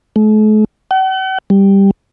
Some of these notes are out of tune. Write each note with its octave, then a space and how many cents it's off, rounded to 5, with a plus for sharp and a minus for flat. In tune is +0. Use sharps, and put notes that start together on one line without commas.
A3 -45
F#5 +45
G3 +5